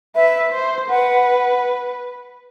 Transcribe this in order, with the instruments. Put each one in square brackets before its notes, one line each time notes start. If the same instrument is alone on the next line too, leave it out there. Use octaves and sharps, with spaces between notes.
[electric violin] B4 [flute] E5
[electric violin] C5
[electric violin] B4 [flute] F#5